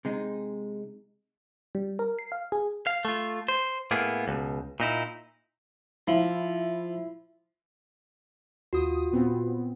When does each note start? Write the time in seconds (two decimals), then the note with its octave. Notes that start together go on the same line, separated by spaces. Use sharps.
0.05 C3 G#3 D#4
1.75 G3
1.99 A#4
2.19 C7
2.32 F5
2.52 G#4
2.87 F5
3.05 A3 F4
3.48 C5
3.91 A2 A#3 B3 G#4
4.28 C#2 B2
4.80 A#2 D#4 E4
6.08 F3 E4
8.73 D#2 F4 F#4 D#6
9.12 A#2 B3 C4